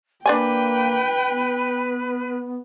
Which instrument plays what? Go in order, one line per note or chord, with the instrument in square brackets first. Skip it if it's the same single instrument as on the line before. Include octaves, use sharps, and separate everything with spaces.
[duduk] A#3 [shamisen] D4 D5 G#5 [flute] B4 [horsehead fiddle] G5
[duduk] B3